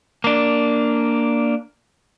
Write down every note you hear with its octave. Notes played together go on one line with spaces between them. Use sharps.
A#3 D4